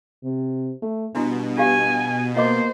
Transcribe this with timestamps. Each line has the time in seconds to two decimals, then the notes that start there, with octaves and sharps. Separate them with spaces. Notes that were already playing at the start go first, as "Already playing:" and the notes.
0.24 C3
0.82 A3
1.15 G2 B2 D4 E4 F#4
1.58 F4 G4 F5 G#5
2.36 A#3 F4 C5 D#5 D6